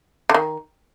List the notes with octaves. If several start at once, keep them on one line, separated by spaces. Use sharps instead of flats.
D3
D#3